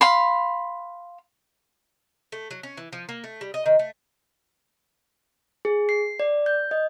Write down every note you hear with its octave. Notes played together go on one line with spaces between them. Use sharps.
F5 B5 C6
A3
F#3
C#4
E3
F3
A#3
A3
G3
D#5
D#3
A3
G#4
C7
D5
G6
D#5